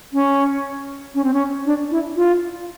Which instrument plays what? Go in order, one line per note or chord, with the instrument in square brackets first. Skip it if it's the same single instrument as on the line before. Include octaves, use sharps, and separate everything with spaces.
[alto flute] C#4
C#4
C4
C#4
D4
E4
F4